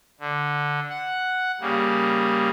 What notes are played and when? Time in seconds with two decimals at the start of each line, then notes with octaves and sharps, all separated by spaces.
0.20 D3
0.90 F#5
1.60 C#3 G3 A#3